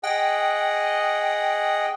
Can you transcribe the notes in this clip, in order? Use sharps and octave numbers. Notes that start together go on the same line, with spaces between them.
G#4 D#5 F#5 G5